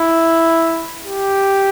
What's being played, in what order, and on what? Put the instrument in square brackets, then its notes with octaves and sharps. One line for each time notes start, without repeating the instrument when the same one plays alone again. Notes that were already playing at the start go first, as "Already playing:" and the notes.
Already playing: [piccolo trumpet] E4
G4